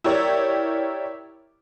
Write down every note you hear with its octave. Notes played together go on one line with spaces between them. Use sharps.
E4 G4 A#4 C#5 D5